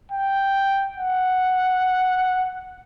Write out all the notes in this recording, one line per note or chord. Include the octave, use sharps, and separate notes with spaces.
G5
F#5